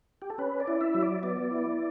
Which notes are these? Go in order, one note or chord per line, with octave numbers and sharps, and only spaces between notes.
G4
A4
C#4 B4
D5
E4
E5
F#3
D5
B3 D5
E4